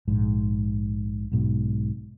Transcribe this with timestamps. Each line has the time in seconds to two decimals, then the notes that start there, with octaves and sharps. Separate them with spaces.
0.08 A#1 G#2
1.32 B1 G#2 B2